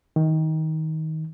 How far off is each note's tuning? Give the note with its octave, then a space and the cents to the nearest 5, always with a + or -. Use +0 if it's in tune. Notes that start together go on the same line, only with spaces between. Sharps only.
D#3 +20